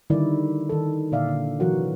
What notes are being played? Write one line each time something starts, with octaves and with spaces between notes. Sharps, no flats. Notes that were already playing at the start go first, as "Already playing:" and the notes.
D3 D#3 G3 D#4 E4 D5
D#3 A4
A#2 D3 D5 E5 F5
D3
C3 E3 F#3 F#4 A#4 F#5